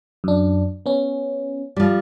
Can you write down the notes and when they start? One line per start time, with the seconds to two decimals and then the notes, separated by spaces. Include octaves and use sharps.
0.24 F#2 D4
0.86 B3 C#4
1.76 F3 G3